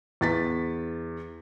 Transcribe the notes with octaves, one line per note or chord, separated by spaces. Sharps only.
E2 A6 B6